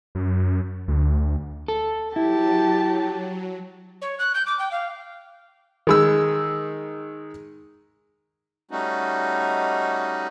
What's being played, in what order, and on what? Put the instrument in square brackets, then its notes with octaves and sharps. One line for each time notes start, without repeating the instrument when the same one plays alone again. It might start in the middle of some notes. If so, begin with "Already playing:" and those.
[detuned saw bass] F#2
D2
[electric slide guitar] A4
[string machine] F#3 [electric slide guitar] E4 [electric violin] G4 A5
[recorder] C#5
F#6
G6
D6
G5
F5
[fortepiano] D#3 G#3 E6
[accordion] G3 A3 C#4 D#4 F#4